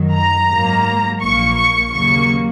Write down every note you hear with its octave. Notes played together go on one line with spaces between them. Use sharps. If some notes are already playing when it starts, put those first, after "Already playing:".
Already playing: F#2 D#3 F#3
A#5
G#2 F#3 A#3
A#1 A#2 A#3 C#6
C#6
D#2 C#3 F#3 A#3 C#6